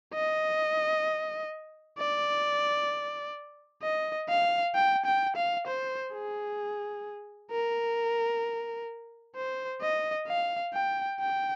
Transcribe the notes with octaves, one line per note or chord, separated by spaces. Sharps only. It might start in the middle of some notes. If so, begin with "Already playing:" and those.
D#5
D5
D#5
F5
G5
G5
F5
C5
G#4
A#4
C5
D#5
F5
G5
G5